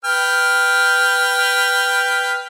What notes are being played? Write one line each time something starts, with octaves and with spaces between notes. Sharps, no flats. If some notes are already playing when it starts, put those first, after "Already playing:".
B4 G5 F6